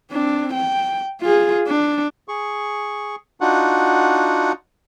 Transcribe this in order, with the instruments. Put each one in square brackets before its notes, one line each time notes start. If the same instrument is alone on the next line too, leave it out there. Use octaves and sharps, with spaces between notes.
[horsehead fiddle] C4 D4
G5
F4 G#4
D4
[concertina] G#4 C#6
D4 D#4 F4 F#4 F#5